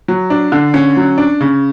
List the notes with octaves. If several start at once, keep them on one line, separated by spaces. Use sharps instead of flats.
F#3
D4
D3
C#4
F#3
D4
C#3